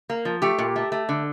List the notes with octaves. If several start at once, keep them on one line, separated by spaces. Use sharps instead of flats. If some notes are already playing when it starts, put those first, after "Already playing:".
A#3
F3
A3 G4
A#2
A3
A3
D3